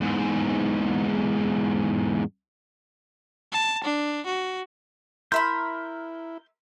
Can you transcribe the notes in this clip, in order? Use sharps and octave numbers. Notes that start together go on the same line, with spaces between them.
E2 G#2
A5
D4
F#4
E4 A#4 E5 B5 C6 G6